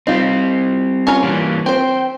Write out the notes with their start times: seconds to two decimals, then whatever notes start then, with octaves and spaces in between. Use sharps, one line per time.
0.07 G3 C4 D#4 F4
1.07 C#4 F4 A#5
1.23 E3 G3 A#3
1.66 C4 C5 G5